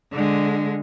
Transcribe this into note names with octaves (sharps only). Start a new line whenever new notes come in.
D3 G#3